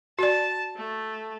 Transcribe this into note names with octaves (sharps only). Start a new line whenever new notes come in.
F#4 D5 A5
A3